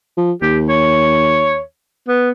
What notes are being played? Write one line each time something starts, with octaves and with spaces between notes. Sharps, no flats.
F3
D#2 G4
C#5
B3